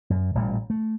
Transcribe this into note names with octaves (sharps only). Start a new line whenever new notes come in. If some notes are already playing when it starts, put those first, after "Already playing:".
F#2
A1 A#2 G3
A3